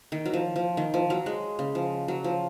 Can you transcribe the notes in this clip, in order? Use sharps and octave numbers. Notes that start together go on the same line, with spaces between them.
D#3
F#3
F3
F3
D#3
F3
F#3
G#3
C#3
F3
F#3
F3